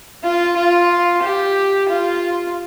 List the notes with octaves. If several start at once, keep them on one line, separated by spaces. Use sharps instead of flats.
F4
F4
G4
F4